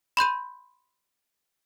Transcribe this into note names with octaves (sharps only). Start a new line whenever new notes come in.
B5 C6 G6 D#7